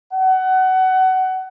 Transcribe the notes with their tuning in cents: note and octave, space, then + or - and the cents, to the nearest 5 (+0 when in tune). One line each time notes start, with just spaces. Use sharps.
F#5 +25